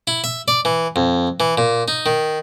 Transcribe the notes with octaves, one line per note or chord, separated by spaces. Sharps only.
E4
E5
D5
E3
F2
E3
A#2
D#4
D#3